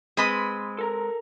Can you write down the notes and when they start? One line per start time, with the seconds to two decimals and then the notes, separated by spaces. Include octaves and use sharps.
0.17 G#3 C4 B4 D#5 B5 D#6
0.79 A4 A#4 A#5